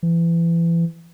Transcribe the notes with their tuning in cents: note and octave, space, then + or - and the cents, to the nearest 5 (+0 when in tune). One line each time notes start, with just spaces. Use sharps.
E3 +30